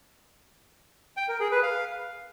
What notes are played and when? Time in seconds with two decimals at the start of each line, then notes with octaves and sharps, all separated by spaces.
1.17 G5
1.28 A#4
1.40 G#4
1.52 B4
1.63 F5